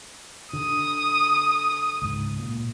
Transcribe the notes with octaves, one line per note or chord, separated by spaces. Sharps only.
D3 D#6
C#2 G#2
A#2